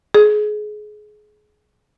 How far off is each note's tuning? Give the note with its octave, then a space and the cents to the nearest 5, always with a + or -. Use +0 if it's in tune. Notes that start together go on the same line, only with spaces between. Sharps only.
G#4 +25